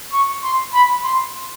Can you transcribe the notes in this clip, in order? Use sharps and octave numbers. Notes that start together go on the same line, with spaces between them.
C#6
C6
B5
C6